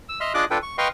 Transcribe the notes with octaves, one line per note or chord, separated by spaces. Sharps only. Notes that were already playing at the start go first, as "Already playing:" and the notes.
E6
D#5 E5 C6 F6
D4 F4 G#4 D#5 D6 F#6
D4 F4 A4 B4 G5
C#6
B4 D#5 F5 G5 C6 C#6